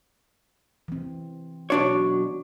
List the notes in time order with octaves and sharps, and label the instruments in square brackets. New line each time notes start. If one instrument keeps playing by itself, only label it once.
[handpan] E3 C4
[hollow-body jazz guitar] B1 D4 C#5 [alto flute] F#4